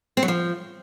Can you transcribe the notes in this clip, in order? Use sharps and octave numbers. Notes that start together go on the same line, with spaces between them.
C4
F#3
F3